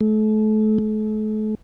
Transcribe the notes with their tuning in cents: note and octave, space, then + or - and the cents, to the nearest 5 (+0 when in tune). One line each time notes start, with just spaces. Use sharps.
A3 -35
A3 -40